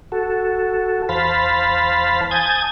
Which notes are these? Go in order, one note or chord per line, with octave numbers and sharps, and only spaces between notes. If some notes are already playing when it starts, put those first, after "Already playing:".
F#4 A4
E2 C5 F5 A5 B5
G#5 A5 D#6 G6 G#6